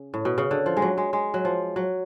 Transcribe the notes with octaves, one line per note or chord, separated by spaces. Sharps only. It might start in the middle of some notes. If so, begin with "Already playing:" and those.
Already playing: C#3
A2
B2
C#3
D3
F3
G#3
F#3
G#3
G#3
F#3
F3
F#3